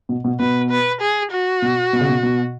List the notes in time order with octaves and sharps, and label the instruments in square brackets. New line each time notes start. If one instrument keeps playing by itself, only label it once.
[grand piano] B2
B2
[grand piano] B2 [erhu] B4
[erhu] B4
G#4
F#4
[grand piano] B2
B2
C#3
B2
B2